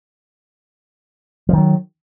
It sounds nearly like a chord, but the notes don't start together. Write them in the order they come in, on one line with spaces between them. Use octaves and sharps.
F3 D#3 F#3